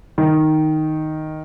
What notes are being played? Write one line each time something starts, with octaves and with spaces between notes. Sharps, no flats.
D#3